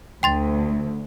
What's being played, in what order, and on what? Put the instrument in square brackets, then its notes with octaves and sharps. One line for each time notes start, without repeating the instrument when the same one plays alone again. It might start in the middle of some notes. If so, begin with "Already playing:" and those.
[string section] D2 [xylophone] G5 C6 A6